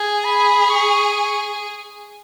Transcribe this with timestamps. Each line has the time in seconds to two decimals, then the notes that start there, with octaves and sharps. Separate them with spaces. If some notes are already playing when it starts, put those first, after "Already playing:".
Already playing: G#4 G#5
0.25 B5
0.70 C#6